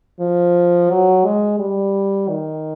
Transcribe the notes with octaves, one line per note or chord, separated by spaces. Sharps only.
F3
F#3
G#3
G3
D#3